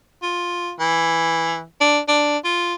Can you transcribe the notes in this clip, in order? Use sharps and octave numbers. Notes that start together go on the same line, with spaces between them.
F4
E3
D4
D4
F4